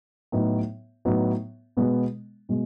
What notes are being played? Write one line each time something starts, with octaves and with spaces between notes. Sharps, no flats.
A2 F#3 B3 D#4
A2 F#3 B3 D#4
B2 G#3 B3
B2 G#3